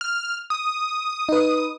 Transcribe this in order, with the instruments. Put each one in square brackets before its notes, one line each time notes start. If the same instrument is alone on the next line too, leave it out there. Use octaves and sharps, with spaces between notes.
[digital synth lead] F6
D#6
[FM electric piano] D#4 B4